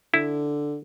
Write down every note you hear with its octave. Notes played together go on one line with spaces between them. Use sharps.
D3 E4